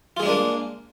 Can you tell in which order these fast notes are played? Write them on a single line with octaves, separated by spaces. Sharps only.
F4 G#4 G#3 D4 A#3